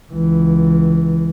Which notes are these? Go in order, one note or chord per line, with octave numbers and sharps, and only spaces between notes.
C#2 E3